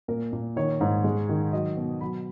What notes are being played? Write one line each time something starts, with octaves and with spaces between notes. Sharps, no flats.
A#2 A#4
A#2
D#3 C#5
G#2
G#3
D#3
F#3 D#5
B2
F#3 B5